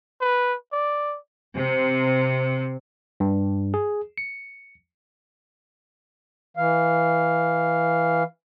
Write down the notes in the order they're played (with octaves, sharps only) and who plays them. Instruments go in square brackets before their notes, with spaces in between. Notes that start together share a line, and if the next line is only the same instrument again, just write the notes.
[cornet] B4
D5
[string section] C3
[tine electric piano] G2
G#4
C#7
[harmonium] E3 F5